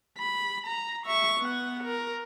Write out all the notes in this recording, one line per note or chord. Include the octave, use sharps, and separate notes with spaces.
B5
A#5
E5 C#6
B3 F#5
A#4